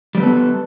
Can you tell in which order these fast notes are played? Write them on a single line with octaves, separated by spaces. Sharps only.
G3 C4 B3 A4